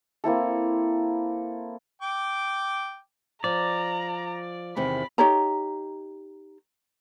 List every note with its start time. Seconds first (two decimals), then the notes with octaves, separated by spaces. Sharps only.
0.24 A#3 C4 E4 A4
2.02 G5 D6
3.44 F3 D5 A#5
4.76 E2 C3 D#3 B5
5.18 D#4 G4 C#5 A#5